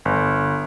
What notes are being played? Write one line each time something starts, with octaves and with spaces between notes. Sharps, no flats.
G1